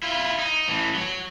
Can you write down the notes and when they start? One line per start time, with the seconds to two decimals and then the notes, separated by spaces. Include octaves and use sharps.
0.03 E4 F4
0.38 D#4
0.68 A2 E3
0.95 F#3